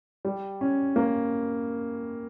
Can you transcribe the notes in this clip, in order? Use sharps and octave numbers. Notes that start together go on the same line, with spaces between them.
G3
C#4
A#3